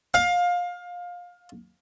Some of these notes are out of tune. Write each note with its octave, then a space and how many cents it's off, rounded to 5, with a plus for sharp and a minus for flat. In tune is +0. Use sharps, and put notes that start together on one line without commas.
F5 +20